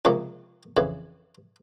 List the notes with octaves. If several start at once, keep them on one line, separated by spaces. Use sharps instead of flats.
C#2 C3 F3 A#3 F4
F2 C#3 E3